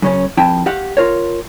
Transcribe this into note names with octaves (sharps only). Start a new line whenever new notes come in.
F#2 C#3 C#4
F2 E4 G5 A5
G4 F5 F#5
F4 A#4 C#5